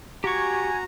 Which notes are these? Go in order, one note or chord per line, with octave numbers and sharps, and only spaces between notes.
F#4 G4 G#5 A#5 C#6 G#6